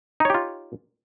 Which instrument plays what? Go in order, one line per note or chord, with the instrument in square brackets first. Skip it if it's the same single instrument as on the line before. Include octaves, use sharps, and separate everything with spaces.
[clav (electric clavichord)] D#4
C#5
G4
F4